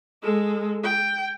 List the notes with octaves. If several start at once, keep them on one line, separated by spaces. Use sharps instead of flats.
G#3 A4
G5